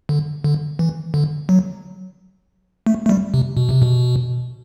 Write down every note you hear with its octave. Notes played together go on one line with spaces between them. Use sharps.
D3
D3
E3
D3
F#3
A3
A3
G3
C3
B2
C3
B2